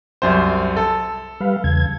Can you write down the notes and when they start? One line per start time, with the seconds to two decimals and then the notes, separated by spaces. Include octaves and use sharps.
0.22 C2 F#2 C5
0.77 A4
1.40 G3 B4 F5
1.64 E2 C#3 G#6